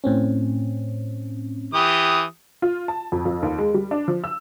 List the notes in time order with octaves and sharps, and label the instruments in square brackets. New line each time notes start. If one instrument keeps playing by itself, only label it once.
[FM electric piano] A2 C4 C#4
[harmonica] E3 G4 D#6
[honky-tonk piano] F4
A5
F2
F2
D#2
G#3
G3
D4
F3
E6